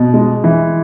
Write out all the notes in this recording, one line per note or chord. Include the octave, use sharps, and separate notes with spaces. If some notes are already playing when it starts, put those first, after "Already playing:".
Already playing: B2
G#3
E3